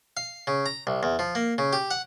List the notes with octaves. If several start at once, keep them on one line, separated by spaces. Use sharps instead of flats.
F5
C#3
A#5
C2
E2
F3
A#3
C#3
G4
F#5